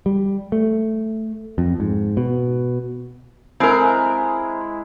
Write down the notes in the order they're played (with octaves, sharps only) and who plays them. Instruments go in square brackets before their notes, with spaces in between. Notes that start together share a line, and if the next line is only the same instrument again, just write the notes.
[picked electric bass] G3
A3
F2
G#2
B2
[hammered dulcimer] G#3 E4 [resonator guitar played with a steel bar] C4 A#4